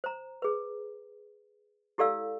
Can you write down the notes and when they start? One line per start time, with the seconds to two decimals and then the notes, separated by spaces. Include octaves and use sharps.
0.04 C5 A#5
0.42 G#4 B4
1.98 E4 G4 A4 D5 F5 E6